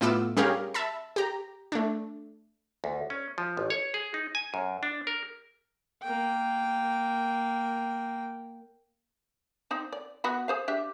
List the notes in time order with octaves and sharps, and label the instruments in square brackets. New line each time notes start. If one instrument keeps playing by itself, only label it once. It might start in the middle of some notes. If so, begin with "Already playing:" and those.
[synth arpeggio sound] A2 A3 B3 F4 D6 E6
G3 C#4 G4 G#4 A#4 F5
E5 A5 B5
G4 A#5
A3 D4
[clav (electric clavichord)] D2
C#4
F3
A1
C#5
G#4
D#4
G#5
F#2
D4
A#4
[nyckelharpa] A#3 G5
[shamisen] C4 D#4 C5
D5
B3 F#4 B5
G#4 C5 F5
D4 G4 E5